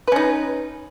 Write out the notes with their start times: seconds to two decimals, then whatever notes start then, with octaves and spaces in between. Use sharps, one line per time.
0.08 B4
0.12 C#4
0.16 D#4